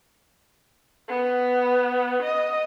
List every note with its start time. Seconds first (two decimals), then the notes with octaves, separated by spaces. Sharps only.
1.08 B3
2.23 D#5